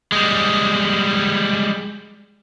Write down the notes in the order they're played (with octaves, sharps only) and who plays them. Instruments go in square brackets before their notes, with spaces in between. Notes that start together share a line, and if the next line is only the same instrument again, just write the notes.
[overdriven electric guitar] G3 G#3